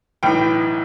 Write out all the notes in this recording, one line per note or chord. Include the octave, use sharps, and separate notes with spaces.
B1 A2 E3 G5